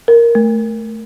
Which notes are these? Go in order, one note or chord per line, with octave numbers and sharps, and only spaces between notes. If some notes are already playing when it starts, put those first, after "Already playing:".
A#4
A3